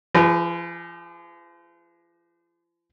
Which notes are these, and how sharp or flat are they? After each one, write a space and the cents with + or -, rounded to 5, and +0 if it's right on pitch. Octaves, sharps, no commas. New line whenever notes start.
F3 -40 G#4 +0 B4 +0